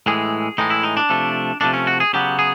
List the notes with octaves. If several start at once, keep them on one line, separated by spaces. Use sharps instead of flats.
A2 E3 G#3 G#4
A2 E3 G#3 D#4
E4
D#4
D4
C3 F3 A3
C3 F3 A3 D4
C#4
F#4
G#4
C#3 F#3 B3 G4
G#4